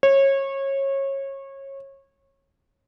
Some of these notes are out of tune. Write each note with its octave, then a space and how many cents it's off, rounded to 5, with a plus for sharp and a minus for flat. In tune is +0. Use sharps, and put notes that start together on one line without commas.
C#5 -25